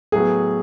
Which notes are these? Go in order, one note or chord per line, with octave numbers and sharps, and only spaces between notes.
A2 F#3 B3 G#4